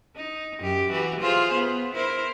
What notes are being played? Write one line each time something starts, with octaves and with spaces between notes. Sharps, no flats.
D#4
F#2 G4
E3 F#4 G4
F4 G#4 C5
B3
E4 A#4 C5